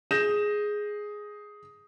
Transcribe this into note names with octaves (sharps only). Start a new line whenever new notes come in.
G#4 D#6 G6 A#6 E7